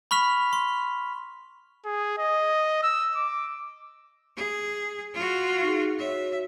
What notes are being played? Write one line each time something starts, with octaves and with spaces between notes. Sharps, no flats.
B5 C#6 F6 B6 F7
C6
G#4
D#5
E6
D6
G#4
F4 F#4
D#4 G#4
F#4 C#5 E5